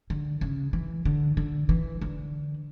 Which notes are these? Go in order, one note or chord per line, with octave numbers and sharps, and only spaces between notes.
D3
C#3
E3
D3
D3
E3
D3